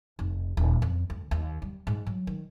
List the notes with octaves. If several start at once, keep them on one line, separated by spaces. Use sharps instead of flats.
F1
D#1
F2
D2
D#2
G3
G#2
F#3
D#3